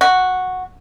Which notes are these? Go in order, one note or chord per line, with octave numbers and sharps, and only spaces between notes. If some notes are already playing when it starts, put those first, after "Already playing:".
F#4